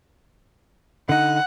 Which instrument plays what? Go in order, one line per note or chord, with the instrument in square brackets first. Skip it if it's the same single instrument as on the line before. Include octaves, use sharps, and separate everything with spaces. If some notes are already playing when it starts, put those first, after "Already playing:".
[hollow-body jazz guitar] D3 D#4 [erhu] F#5